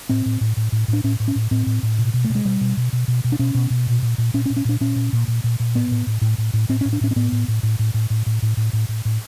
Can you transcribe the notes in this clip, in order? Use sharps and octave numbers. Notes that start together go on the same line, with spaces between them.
A2 C4
A2
A2
A2
A2
A2
D4
A2 C#4
A2
C#4
A2
A2 C4
A2
A2
B2
B2
A3
B2
G#3
B2 G3
B2
B2
B2
B2
B2
D4
B2 C#4
B2
B2
A#2
A#2
A#2
A#2 C#4
C#4
A#2
C#4
A#2 D4
A#2 C#4
A#2
A#2
A#2
A#2
A#2
A2 B3
A2
A2
A2
A2
A2
A2 C4
C#4
A2
D4
A2 C#4
C4
A2 B3
A2
A2
A2
A2
A2
A2
A2
A2
A2
A2
A2
A2